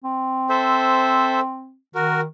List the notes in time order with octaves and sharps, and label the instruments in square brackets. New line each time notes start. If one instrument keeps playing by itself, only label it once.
[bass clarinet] C4
[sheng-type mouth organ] A4 C5 E5
[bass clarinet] D#3 [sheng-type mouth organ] F#4 A#4